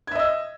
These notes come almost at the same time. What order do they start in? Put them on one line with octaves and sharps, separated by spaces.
G#6 E5 D#5 E6